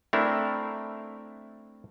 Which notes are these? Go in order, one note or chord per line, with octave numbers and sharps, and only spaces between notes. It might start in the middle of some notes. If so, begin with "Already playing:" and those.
A3 C4 D4 E4 A#4